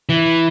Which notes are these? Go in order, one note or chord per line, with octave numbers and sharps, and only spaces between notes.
E3